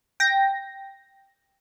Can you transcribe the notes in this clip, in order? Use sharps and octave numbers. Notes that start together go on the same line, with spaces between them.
G5 A#6